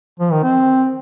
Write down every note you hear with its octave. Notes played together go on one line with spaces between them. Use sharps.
F3
D#3
C4